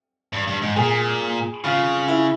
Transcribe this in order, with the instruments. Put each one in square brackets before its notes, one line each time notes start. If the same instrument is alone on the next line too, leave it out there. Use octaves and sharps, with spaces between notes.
[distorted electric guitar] G2
G2
G#2
[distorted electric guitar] A#2 [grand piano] G#4
[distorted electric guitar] C#3 [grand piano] F4
[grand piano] E4